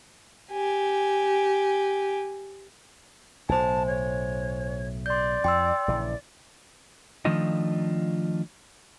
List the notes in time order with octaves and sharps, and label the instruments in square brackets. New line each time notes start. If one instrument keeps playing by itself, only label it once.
[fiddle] G4 G#5
[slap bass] B1 A2 [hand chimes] C5 G#5 [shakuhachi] A5
[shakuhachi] C#5
[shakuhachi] D5 [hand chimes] C6 G6
[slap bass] F2 [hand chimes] G5 C6 E6
[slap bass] A#1 C#3 E3
[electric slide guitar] D#3 F3 A3 D4 F4 D#5